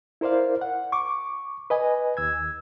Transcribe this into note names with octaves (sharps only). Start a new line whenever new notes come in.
E4 A#4 C5 D5 F5
F#5
C#6 D6
B4 D#5 G#5
D#2 E6 G#6